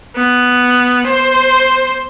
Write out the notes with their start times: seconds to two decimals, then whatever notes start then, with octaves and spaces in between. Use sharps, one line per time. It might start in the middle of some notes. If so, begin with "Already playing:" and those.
0.16 B3
1.07 C5